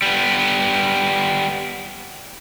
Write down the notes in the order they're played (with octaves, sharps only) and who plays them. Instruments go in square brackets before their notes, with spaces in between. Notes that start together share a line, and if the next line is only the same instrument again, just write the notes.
[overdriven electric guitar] G3 B3